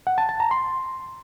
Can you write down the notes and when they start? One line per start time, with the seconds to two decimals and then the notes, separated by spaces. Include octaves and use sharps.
0.07 F#5
0.18 A5
0.29 A5
0.40 A#5
0.51 C6